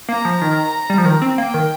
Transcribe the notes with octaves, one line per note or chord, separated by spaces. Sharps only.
A#3 A#5
F3
D#3
G3
F3
D#3 A#5
C4
A#3 G5
D#3